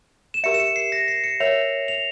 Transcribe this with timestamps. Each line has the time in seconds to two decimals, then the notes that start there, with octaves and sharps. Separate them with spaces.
0.34 E7
0.44 G4 A#4 E5 C#7
0.54 E7
0.60 C#7
0.76 C7
0.92 A#6
1.08 C7
1.24 C#7
1.40 A#4 C#5 E5 F7
1.88 F7